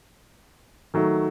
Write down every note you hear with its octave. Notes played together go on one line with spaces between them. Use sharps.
D#3 F#3 A3